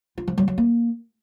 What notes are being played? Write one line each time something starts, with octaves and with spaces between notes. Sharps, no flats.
F4
F3
F#3
F#3
A#3